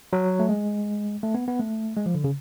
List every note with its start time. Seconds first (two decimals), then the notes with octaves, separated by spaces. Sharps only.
0.13 F#3
0.39 A3
0.49 G#3
1.23 A3
1.34 B3
1.48 B3
1.59 A3
1.97 G#3
2.06 F3
2.15 D3
2.24 C#3